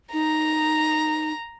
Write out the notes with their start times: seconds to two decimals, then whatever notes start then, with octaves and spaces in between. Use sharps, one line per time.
0.13 D#4 A#5